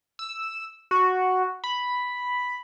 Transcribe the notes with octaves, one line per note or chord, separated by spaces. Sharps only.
E6
F#4
B5